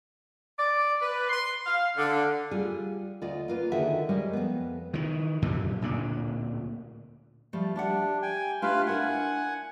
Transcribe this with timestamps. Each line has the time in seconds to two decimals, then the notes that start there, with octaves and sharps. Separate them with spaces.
0.58 D5
1.01 B4
1.29 C6
1.66 F5
1.97 D3
2.51 G3 F4 G#4
3.21 D2 F4 D5 D#5
3.48 A#3 F4 B4
3.72 D3 D#3 F#4 G#4 E5 F#5
4.09 G3 G#3 A#4 C#5
4.33 F2 B3
4.94 D#3 E3
5.42 F#2 A#2 D3 G3
5.81 D1 A#2 D3 D4
7.53 F3 G3 A3
7.76 D4 G4 E5 F#5
8.22 G5 G#5
8.62 A3 D4 F4 G4 B4 F5
8.87 D4 E4 A#4 F#5 G#5